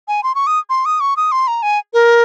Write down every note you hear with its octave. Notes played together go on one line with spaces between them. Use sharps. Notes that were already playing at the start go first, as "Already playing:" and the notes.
G#5
C6
C#6
D#6
C6
D#6
C#6
D#6
C6
A#5
G#5
A#4